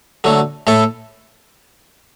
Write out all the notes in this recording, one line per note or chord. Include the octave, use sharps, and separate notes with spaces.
D3 F#3 A3
A2 A3 E4 A4